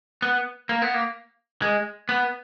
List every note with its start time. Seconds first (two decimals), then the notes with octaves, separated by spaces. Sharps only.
0.22 B3
0.69 A#3
0.82 B3
0.94 A#3
1.62 G#3
2.09 B3